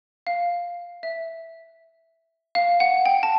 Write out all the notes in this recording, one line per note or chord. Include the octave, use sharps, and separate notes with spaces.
F5
E5
F5
F#5
G5
A5